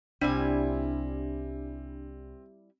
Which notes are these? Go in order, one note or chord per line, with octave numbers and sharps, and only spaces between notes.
C2 G3 C4 D4 E4 G#5